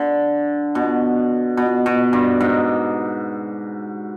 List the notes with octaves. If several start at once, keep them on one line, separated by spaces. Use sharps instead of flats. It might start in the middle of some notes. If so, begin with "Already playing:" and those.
Already playing: D3
B2
B2
B2
G2
G#2